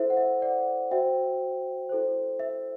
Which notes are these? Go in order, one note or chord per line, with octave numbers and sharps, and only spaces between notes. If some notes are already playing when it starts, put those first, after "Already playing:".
Already playing: E4 A4 C5 E5
F#5
E5
D5 F#5
F#4 C5 E5 G5
E4 A4 C5
E5